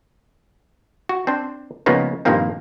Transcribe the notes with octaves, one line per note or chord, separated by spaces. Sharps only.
F#4
C4 D4 C5
C#3 F3 G#3 A#3 B3 D#4
G2 A#2 D#3 F3 A#3 C4